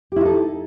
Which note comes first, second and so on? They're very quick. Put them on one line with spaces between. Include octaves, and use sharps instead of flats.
G4 E4 D#4 A4